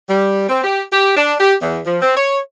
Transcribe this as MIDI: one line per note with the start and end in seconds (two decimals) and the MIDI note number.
0.09 0.45 55
0.49 0.63 60
0.64 0.83 67
0.92 1.12 67
1.17 1.35 62
1.39 1.55 67
1.62 1.80 40
1.86 1.97 53
2.02 2.16 60
2.16 2.38 73